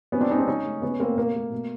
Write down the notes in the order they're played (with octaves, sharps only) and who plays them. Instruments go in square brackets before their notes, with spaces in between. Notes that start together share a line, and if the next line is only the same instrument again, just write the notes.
[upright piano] C3 B3 C#4
C4 D4
G#3 C#4 D#4
C4 D4
C#3 C#4 D#4
A3
C#3 B3 C#4
A3 A#3 C4
B2 A#3
A3
B2